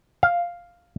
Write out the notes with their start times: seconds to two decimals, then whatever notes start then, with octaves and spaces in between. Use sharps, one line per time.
0.23 F5